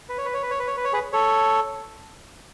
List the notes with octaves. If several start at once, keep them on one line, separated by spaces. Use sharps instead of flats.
B4
C#5
B4
C#5
B4
C#5
B4
C#5
B4
C#5
G#4 B4
A4 C#5